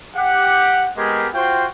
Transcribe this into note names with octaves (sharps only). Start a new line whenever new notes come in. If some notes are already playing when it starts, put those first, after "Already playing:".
G4 F#5
G#3 B3 G4 G#4 A#4
F4 F#4 C5 G5